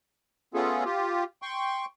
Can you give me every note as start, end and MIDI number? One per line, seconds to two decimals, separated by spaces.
0.54 0.84 57
0.54 0.84 59
0.54 0.84 61
0.54 0.84 65
0.54 0.84 68
0.54 0.84 69
0.85 1.24 65
0.85 1.24 67
1.42 1.85 79
1.42 1.85 84
1.42 1.85 85